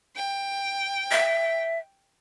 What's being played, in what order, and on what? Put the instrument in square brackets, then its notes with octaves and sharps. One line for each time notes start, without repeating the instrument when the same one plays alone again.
[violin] G5
[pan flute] E5